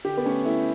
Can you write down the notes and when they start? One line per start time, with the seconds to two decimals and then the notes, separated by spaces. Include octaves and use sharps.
0.05 D3 G4
0.17 B3
0.25 A3 C#4
0.45 A3 E4